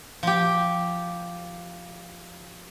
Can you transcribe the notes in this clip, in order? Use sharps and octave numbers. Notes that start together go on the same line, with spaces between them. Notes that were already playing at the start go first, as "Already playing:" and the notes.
F3 G4